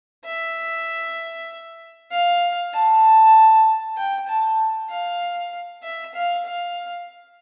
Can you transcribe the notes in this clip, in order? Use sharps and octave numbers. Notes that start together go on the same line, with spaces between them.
E5
F5
A5
G5
A5
F5
E5
F5
F5